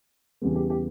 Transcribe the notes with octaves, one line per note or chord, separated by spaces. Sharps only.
E2 C#3 E3 G3 B3
G4
G4